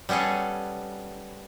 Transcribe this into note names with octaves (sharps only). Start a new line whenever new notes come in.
G3 B3 C#4 G#4 A4